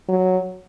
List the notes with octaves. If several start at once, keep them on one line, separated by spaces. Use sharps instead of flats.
F#3